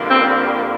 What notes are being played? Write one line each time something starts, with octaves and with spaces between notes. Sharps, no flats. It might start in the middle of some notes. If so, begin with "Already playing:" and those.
Already playing: F2 D3 G3 A#3
C4